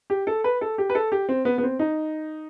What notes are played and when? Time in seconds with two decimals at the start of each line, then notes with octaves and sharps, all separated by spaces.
0.10 G4
0.27 A4
0.44 B4
0.61 A4
0.78 G4
0.90 B4
0.95 A4
1.12 G4
1.29 C4
1.45 B3
1.58 B3
1.63 C4
1.79 D#4